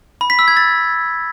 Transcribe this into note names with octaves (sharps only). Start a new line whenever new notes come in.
B5
B6
E6
G#6
A6